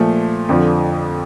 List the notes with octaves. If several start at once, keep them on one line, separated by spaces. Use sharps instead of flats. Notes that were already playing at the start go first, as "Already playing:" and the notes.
Already playing: A#2 F3 A3
F2 D3 F3